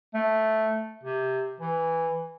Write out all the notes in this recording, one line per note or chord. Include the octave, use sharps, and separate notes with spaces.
A3
C3
E3